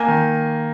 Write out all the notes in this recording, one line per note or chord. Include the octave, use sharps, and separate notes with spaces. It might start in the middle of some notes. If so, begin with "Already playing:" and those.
Already playing: A#3 G#5
D#3